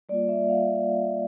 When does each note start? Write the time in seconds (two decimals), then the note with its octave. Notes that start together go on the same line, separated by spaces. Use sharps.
0.09 G3 A#3 F4 D5
0.29 E5
0.49 F5